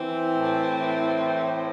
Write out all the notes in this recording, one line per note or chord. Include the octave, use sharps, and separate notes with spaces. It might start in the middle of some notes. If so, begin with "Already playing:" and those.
Already playing: E3 C4
A2
E3
A2